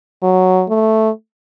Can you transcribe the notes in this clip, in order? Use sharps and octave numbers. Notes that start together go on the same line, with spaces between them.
F#3
A3